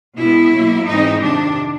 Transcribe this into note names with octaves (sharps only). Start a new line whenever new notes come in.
B2 G#3 B3 E4
B2 F#3 A#3
G#2 E3 G#3 C4 D#4
F2 C3 D#3 D4